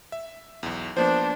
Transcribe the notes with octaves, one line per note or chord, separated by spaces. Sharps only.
E5
B1 E2
F3 A#3 B3 D4 C5